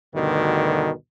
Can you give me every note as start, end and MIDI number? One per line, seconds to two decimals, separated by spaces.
0.14 0.91 38
0.14 0.91 43
0.14 0.91 47
0.14 0.91 50
0.14 0.91 51